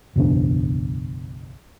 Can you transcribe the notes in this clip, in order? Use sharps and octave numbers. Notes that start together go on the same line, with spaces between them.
F#1 B1 E2 D4